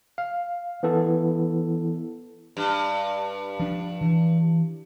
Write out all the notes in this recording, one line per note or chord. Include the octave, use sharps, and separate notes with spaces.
F5
E3 B3 E4 A4
G2
F3 D4
E3